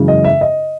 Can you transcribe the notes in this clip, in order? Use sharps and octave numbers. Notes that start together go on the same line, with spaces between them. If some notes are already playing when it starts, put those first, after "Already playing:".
Already playing: F#2 C#3 E3 G#3
D#5
E5
D#5